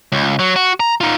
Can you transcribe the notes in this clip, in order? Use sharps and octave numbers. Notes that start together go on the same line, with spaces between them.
C#2
F#3
F#4
A#5
D#4 F4